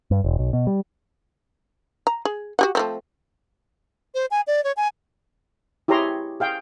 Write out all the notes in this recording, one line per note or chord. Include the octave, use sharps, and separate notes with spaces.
G2
E1
B1
B2
G3
A#5
G#4
F#4 G4 F#5
F3 A3 C4
C5
G#5
D5
C#5
G#5
E4 G4 G#4 C#5 A#5 C6
G#4 F5 G5